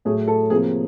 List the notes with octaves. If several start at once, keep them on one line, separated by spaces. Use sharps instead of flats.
A2 F#3 A3 G#4
A4
C3 F3 A#3 G#4